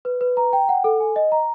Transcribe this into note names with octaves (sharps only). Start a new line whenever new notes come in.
B4
B4
A#5
G5
F#5
A4
G#5
D#5
A#5